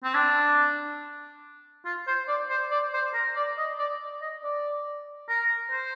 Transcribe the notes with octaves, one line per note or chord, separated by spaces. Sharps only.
C4
D4
F4
C5
D5
C5
D5
C5
A#4
D5
D#5
D5
D#5
D5
A#4
C5